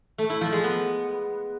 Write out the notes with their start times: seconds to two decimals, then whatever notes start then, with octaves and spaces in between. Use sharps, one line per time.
0.18 A3
0.30 E4
0.41 F3
0.52 G#3
0.64 B3